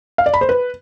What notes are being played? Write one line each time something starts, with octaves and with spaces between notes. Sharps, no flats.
F5
D5
B5
C5
B4